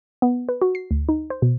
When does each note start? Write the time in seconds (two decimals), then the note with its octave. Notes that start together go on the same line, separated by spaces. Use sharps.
0.22 B3
0.49 B4
0.62 F#4
0.75 C7
0.91 D2
1.09 D#4
1.30 C5
1.42 B2